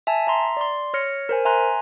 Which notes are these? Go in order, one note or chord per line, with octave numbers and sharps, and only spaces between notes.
E5 G#5 A5
E5 A#5 C6
D5 C6
C#5 F6 A#6 C#7
A#4 C5 G#5
E5 G#5 A#5 C6 F#6